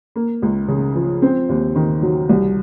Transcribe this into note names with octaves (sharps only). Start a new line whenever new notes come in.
A#3
C#2
C#3
F3
C4
D#2
D#3
F#3
C2